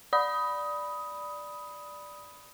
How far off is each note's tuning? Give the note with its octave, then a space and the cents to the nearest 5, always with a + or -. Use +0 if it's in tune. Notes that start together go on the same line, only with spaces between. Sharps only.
D5 +0 B5 +0 D#6 +15